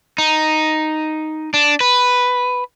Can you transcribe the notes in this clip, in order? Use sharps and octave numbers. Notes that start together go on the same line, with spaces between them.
D#4
D4
B4